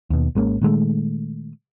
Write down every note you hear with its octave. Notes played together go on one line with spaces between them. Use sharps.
D#2 B2
G#1 G#3 A#3 C#4
A#2 D#3 G#3 A3